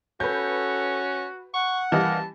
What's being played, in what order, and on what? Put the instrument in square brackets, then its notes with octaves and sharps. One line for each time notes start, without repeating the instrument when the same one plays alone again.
[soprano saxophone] C#4 [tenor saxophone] F#4 [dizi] A4 [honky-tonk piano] B4 G6
[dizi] F#5 [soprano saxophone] C#6
[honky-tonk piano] E3 G3 D#5 [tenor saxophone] A#3 [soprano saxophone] A5